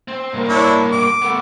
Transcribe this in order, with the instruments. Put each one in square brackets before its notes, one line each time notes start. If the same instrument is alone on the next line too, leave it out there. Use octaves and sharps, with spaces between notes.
[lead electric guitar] C4
G2 A#3
[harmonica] D4 E4 C#5
D6
[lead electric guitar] A3 B3